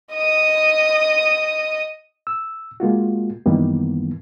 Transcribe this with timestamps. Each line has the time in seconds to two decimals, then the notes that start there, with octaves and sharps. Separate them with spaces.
0.13 D#5 D#6
2.27 E6
2.80 G#3 A#3 F4 F#4
3.46 F#2 D#3 E3 G3 A#3 B3